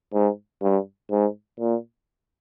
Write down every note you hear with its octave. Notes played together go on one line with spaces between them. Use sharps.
G#2
G2
G#2
A#2